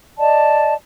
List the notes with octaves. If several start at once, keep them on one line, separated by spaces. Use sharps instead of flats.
D5 D#5 A5